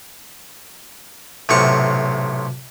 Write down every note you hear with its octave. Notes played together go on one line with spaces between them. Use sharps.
B1 A2 C3 C#6